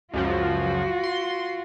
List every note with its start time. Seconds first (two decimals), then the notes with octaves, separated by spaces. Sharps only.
0.14 C#2 F#2 F3 F4 F#4
1.04 C6